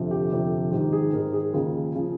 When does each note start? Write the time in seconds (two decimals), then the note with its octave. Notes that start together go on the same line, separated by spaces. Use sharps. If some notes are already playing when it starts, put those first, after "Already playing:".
Already playing: G1 F2 C3 F3
0.11 G4
0.31 G1 F2 C3 F3
0.71 G#1 G#2 D#3 G4
0.92 G#4
1.13 G#1 G#2 D#3 A#4
1.33 G#4
1.53 D#2 C#3 F3
1.95 C#3 F3